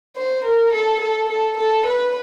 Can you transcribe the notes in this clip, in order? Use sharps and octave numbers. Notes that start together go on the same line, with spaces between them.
C5
A#4
A4
A4
A4
A4
B4